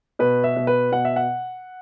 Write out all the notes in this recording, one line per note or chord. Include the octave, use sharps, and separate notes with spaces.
B2 B4
E5
B2
B4
B2 F#5
E5
F#5